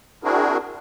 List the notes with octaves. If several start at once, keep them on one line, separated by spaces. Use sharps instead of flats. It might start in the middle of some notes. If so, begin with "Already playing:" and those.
C4 D4 E4 F#4 G#4 A#4